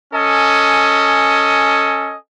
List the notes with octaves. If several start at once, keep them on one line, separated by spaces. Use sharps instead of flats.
C#4 A4 D#5 G#5